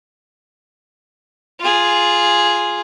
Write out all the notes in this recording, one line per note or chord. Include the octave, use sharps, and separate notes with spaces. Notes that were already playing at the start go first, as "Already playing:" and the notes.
F4 G#4